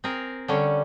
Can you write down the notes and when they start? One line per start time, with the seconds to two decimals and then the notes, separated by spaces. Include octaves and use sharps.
0.04 C4 G#4 A#4
0.48 D3 G3 C#4